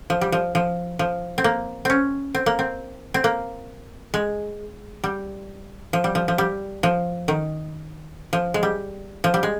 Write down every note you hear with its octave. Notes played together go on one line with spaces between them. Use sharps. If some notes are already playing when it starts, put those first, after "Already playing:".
F3
G3
F3
F3
F3
C4
A#3
C4 C#4
C4
A#3
C4
C4
A#3
G#3
G3
F3
G3
F3
F3
G3
F3
D#3
F3
G#3
G3
F3
G3
G#3